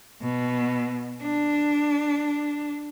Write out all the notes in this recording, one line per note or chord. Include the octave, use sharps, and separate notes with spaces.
B2
D4